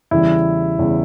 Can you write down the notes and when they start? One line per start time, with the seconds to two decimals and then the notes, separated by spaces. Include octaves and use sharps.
0.11 E2 C#3 E3 G3 E4
0.79 E2 C#3 E3 G3